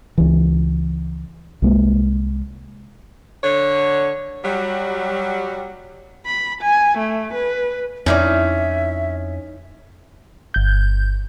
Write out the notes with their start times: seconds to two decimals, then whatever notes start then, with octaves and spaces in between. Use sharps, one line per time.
0.18 C#2 E3
1.62 C2 G#3 A#3
3.44 D3 C#5
4.45 F#3 G3
6.26 B5
6.62 G#5
6.98 A3
7.34 B4
8.06 F2 C#4 D#4 E4 D5 E5
10.54 G1 G6